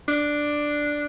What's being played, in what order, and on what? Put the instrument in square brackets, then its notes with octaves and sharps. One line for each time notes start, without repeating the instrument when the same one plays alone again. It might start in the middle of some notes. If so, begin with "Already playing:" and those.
[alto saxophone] D4